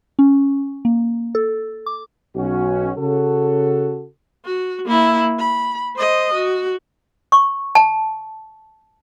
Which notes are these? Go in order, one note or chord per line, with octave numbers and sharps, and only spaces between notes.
C#4
A#3
A4
D6
B1 C#4 F#4
C#3 F#4 A4
F#4
A#3 E4
B5
C5 D#5
F#4
C#6
A5